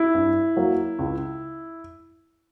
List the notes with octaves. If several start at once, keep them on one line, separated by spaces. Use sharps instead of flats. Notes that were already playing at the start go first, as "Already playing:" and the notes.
Already playing: E4
G2
F#3 A#3
C#2